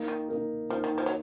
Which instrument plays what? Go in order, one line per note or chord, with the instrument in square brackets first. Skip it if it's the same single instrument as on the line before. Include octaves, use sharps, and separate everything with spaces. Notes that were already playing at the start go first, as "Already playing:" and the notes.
Already playing: [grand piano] A#3 D#4 A#4
[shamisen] D#3
[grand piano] A#3 D#4 A#4
[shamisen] F3 [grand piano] A#3 D#4 A#4
[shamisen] D#3
F3
F#3